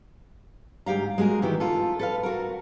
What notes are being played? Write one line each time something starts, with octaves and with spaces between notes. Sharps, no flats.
D2 G#2 G4 F5 A#5
G#3 A#3 F#4 G#4 A#4
D#3 E3 G4
F4 A4
A4 B4 F5
F#4 A#4